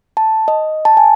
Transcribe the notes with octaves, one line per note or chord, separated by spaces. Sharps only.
A5
D#5
A5
G#5